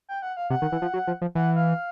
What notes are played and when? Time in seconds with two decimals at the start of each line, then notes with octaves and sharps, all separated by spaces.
0.09 G5
0.22 F#5
0.37 F5
0.50 C3 F#5
0.62 D#3
0.72 E3
0.82 F3
0.93 F#3
1.07 F3
1.21 F3
1.35 E3 F#5
1.56 F5